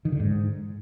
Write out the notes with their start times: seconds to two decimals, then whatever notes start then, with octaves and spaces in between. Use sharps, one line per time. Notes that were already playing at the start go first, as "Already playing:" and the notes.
0.05 D#3
0.12 D3
0.20 G#2